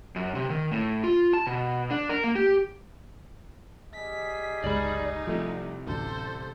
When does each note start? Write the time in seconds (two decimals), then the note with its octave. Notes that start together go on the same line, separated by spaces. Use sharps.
0.16 F#2
0.35 C3
0.50 D#3
0.72 A2
1.04 F4
1.33 A5
1.47 B2
1.90 D4
2.09 A#4
2.24 A#3
2.36 G4
3.94 G3 G#4 D#5 B6
4.64 G1 C#2 G#3 D#4 D5 B5
5.27 C2 C3 F3 A3
5.87 A1 D2 A4 C5